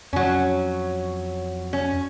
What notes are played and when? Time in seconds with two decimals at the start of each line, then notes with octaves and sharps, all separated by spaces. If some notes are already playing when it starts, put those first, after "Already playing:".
0.13 F2 F#3 C#4
1.73 C#4